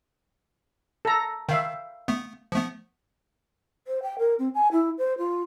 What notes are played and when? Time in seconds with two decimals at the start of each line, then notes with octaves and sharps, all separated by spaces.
1.05 A4 A#5
1.49 D#3 E5 F5 G5
2.08 A3 B3
2.52 F3 A3 B3
3.87 C5
4.03 G5
4.19 A#4
4.39 C4
4.55 G#5
4.72 E4
4.98 C5
5.18 F4